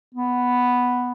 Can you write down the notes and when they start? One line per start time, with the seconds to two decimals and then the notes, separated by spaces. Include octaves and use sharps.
0.14 B3